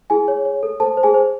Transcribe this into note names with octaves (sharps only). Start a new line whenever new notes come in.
E4 G#4 G#5
C#5
C#5
A4
A4 C5 A5
C5
G#4 G#5
C5